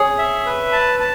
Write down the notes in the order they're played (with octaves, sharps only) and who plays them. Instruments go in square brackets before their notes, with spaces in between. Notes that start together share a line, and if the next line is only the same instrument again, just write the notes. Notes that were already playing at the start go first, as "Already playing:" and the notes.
Already playing: [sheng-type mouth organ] G#4 [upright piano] C#5
[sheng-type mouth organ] E5
B4
A5
A5